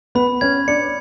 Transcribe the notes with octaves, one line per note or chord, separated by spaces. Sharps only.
B3 B5
C#4 G#6
D4 C#7